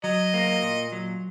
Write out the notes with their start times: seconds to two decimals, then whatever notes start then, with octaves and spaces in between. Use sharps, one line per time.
0.04 F#3 D#5
0.34 A#3
0.63 A#2
0.92 F#3